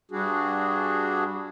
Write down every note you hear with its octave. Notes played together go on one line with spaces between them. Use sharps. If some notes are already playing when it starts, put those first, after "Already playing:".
G2 G3 D4 F#4 G#4